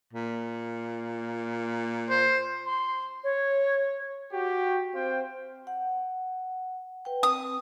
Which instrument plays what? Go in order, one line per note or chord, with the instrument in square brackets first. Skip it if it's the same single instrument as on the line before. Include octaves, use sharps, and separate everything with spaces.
[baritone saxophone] A#2
[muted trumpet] C5
[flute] C6
C#5
[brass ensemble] F#4 G4
C4 C5 F5 G5
[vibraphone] F#5
B4 G5
[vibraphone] C4 [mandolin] D#6